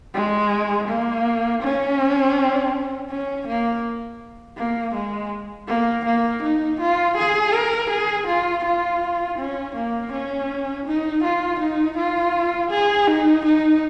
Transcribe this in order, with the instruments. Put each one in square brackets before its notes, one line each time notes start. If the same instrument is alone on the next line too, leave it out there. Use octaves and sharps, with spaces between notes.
[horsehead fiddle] G#3
A#3
C#4
C#4
A#3
A#3
G#3
A#3
A#3
D#4
F4
G#4
A#4
G#4
F4
F4
C#4
A#3
C#4
D#4
F4
D#4
F4
G#4
D#4
D#4